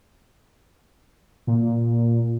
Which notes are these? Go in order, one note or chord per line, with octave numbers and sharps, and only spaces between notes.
A#2